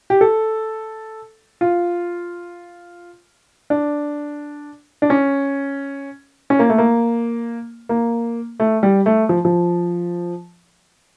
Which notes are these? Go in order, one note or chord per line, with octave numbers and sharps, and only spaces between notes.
G4
A4
F4
D4
D4
C#4
C#4
A#3
A3
A#3
A#3
A3
G3
A3
F3
F3